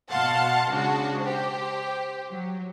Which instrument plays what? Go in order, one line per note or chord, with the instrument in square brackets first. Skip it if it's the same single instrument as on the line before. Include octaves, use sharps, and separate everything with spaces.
[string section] B2 F5 F#5 A5 C6
C#3 G#3 D4 F#4
G4 C5
F#3